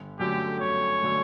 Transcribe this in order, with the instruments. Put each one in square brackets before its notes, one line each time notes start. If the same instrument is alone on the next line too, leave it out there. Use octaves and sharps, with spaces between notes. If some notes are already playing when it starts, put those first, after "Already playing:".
Already playing: [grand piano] G1
[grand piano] F#2 D3 F#3 A3 [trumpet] G4
[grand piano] G1 [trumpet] C#5
[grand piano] D3 F#3 A3